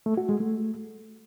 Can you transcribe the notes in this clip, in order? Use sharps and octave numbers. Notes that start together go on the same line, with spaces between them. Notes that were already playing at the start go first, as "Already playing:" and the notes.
A3
F#4
G#3
A3